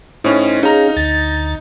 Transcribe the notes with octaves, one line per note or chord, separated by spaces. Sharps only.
A2 C#4 D#4 C5
C#4 D#4 G#4 F5 A#5
D2 A6